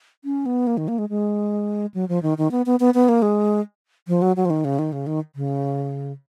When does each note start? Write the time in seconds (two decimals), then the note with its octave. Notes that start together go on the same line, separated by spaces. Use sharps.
0.25 C#4
0.46 B3
0.67 A#3
0.77 D#3
0.88 A#3
0.98 G#3
1.09 G#3
1.94 F#3
2.09 F3
2.23 D#3
2.38 D#3
2.51 B3
2.66 B3
2.80 B3
2.94 B3
3.09 A#3
3.22 G#3
4.08 F3
4.22 F#3
4.36 F#3
4.45 F3
4.50 D#3
4.65 C#3
4.79 D#3
4.93 C#3
5.07 D#3
5.36 C#3